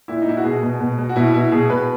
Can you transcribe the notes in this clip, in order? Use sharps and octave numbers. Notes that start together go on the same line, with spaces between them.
A#2 E4
D#4
A#2 E4
F#4
B2 G#4
B2
B2
B2
F#4
B2 E4
B2 E4
B2 G#4
B2 B4